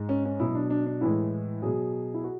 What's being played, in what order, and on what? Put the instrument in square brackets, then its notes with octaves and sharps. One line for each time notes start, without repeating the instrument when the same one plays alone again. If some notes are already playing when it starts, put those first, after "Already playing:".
Already playing: [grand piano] G#2 G#3
C#4
C#4
B2 F#3 E4
D4
D4
D4
A2 E3 G#3 E4
B2 F#3 G#4
E4
F#4